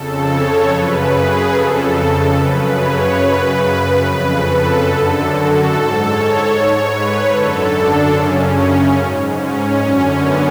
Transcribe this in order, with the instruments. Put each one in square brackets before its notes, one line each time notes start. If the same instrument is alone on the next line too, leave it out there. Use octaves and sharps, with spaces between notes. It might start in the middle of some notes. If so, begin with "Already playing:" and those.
Already playing: [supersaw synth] F2 C#3 A4
C#5
F#2 C#3 B4
G#4
F2 C#3 A4
F#2 C#3 B4
C#5
F#2 C#3 B4
F2 C#3 B4
A4
F#2 D3
F#4
G#2 A4
C#5
G#2
B4
F#2 D3 A4
D4
F#2 C#3 C#4
G#2
C#4
F#2
D3
B3